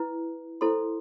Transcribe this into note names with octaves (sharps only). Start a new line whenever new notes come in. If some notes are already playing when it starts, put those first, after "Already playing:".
Already playing: E4 B4
E4 A4 C5 C6